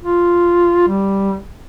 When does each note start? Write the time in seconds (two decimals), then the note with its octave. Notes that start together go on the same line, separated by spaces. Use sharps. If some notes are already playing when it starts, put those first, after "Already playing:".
0.03 F4
0.88 G3